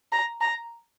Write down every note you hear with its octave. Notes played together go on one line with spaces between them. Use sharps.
A#5
A#5